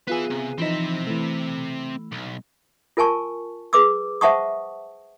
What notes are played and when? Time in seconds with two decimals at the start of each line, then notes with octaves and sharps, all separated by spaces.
0.07 B3 F4 G#4 B4 E5
0.30 C3
0.58 E3 F3 C4 D#4 E5
1.07 E3 A3
2.12 B1
2.97 F4 A#4 G#5 A5 C#6
3.73 G#4 B4 D6 E6
4.21 C5 E5 F#5 A5 C#6 D#6